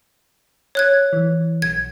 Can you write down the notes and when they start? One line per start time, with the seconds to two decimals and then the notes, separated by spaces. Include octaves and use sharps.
0.75 C#5 F#6 G#6
1.13 E3
1.62 B1 G#6